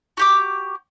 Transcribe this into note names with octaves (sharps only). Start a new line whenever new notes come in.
F#4 G4 D6